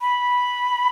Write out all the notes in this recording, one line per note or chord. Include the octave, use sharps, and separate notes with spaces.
B5